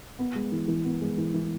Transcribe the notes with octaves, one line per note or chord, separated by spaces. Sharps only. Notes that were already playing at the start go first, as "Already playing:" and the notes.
B3
G#3
E3
E3
B3
G#3
E3
E3